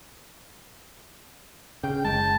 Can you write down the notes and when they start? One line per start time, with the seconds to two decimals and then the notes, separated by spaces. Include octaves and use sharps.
1.84 C#3 G5
2.04 F#1 G#3 A5